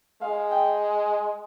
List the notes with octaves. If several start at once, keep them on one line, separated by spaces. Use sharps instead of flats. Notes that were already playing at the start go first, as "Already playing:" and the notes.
G#3 F5
G5